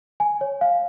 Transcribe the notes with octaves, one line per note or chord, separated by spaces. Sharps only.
G#5
C#5
F5